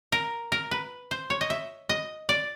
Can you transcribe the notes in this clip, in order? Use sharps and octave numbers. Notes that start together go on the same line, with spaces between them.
A#4
A#4
B4
C5
C#5
D#5
E5
D#5
D5